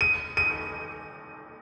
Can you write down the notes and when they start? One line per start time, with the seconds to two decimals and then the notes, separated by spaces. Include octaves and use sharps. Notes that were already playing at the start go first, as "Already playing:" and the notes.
0.01 D#7
0.37 D#7